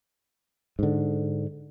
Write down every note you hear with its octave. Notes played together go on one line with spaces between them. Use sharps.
G#2 D3